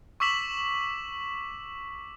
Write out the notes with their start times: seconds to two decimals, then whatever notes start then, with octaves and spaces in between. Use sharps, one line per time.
0.20 C#6 D6 E6 B6 E7 F#7